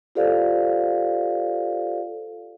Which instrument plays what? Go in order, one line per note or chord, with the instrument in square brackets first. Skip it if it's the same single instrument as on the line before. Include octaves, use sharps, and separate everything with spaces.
[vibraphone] F4 G4 A4 C5 D5 F5